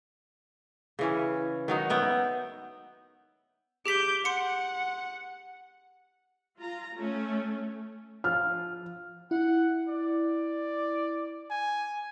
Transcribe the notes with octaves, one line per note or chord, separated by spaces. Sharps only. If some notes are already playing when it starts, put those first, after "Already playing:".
C#3 E3 C#4
D#3 F#3 D#4
B3 E5 G5
G4 G#4 D6 G6 B6
F#5 C6 C#7
F4 A#5
A3 C#4
F3 F4 F6
E4 F#5
D5
G#5